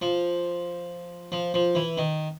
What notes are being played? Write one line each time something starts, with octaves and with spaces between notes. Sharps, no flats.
F3
F3
F3
E3
D#3